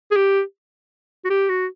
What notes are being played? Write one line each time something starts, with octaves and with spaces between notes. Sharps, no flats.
G#4
G4
F#4
G4
F#4